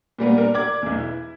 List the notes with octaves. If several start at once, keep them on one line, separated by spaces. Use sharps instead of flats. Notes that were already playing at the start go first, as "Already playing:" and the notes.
A#2 G3 A#3 B3
D4 A#4
D5 D6 G#6
B1 E2
E4